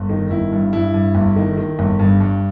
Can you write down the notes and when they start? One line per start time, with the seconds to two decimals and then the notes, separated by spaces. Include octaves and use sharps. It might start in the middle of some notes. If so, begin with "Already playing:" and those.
Already playing: G1
0.09 D#3
0.30 G1 E4
0.52 G2
0.73 G2 E4
0.94 G2
1.15 G1
1.36 D#3
1.57 D#3
1.79 G1
1.99 G2
2.20 G2